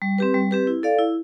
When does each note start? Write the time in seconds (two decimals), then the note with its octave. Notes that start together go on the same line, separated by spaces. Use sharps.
0.02 G3
0.18 C4 G4 B4
0.34 G3
0.51 C4 G4 B4
0.67 E4
0.83 A4 D5 F5
0.98 E4